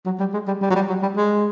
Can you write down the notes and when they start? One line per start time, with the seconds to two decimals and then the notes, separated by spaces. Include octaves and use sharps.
0.06 F#3
0.19 G3
0.33 G#3
0.47 G3
0.62 G3
0.70 F#3
0.75 G3
0.89 F#3
1.02 G3
1.16 G#3